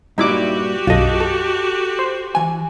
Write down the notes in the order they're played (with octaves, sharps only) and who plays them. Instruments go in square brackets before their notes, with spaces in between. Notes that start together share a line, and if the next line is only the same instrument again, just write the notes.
[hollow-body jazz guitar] G2 A#2 [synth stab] D#4 E4 D6 [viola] F#4 G4
[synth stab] B1 F#2 D#5 [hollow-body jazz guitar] F4 A4
[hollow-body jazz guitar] A4
[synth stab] C5
[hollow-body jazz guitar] E3 G#5